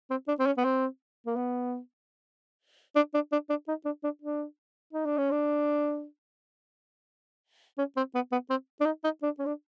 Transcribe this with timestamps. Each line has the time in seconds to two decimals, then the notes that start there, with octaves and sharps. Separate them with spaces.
0.10 C4
0.28 D4
0.39 C4
0.46 C#4
0.57 B3
0.64 C4
1.26 A#3
1.36 B3
2.96 D4
3.14 D4
3.32 D4
3.49 D4
3.68 D#4
3.85 D4
4.04 D4
4.22 D4
4.93 D#4
5.06 D4
5.18 C#4
5.31 D4
7.78 C#4
7.96 C4
8.15 B3
8.32 B3
8.50 C4
8.80 D4
8.86 D#4
9.04 D#4
9.22 D4
9.39 C#4
9.46 D4